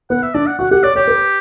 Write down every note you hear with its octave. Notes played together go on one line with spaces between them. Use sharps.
B3 F#5
E5
D4 D5
F#5
F#4 F#5
G4 F#5
C#5 D5
G4 C#5
B4